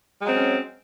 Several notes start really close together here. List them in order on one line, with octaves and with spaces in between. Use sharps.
G#3 F#3 C4 C#4